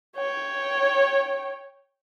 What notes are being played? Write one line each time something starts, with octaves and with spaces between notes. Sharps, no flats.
C#5 G5